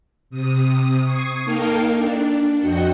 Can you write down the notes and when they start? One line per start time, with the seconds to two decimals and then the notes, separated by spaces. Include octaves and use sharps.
0.30 C3 D#6
1.03 C#6 D#6 G#6 C7
1.44 A#3 D#4 A4 A#4 F5 G5
1.94 D4
2.59 F2 F#4 D#5 G5 C#7